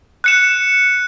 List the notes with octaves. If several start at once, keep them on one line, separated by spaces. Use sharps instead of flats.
F#6 C#7 E7